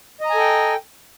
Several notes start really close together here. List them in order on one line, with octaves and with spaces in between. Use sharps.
D#5 A#5 G#5 A4 G5